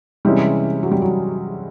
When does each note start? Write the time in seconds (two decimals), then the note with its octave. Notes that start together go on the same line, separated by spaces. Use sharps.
0.25 C3 E3 G3 G#3 C#4 E4
0.83 F#3
0.91 G3
1.02 F#3